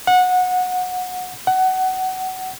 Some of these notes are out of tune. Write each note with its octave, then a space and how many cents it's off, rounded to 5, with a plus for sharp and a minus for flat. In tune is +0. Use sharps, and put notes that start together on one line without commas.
F#5 -20
F#5 +20